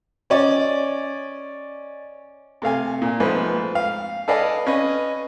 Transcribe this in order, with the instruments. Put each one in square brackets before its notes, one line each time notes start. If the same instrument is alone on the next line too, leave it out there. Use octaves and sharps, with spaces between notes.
[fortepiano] C#4 D5 D#5
C3 A3 F5 G#5
A#2
G#2 F3 A3 B4 C5
F5
A4 B4 D5 D#5 F5 G#5
C#4 B4 D#5